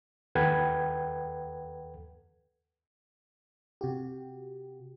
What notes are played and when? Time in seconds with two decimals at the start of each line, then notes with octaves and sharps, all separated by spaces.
0.35 D#2 A4 B4 F#5 G5 G#6
3.81 C3 F#4 G4